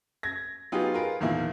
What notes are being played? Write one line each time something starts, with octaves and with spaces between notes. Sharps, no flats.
G#6 A#6
F#3 B3 D#4 F4 G4 G#4
F4 G#4 A#4 B4
E2 A#2 D#3 F3 A#3 E4